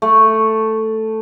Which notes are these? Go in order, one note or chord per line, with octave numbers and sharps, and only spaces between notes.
A3